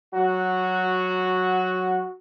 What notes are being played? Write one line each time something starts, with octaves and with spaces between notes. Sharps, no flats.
F#3 F#4